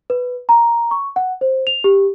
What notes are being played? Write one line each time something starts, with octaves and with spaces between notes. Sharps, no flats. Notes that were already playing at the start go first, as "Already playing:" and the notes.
B4
A#5
C#6
F#5
C5
F7
G4